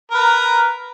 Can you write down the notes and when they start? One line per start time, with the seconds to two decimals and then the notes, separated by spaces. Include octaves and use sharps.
0.11 A#4
0.14 B4
0.17 A#5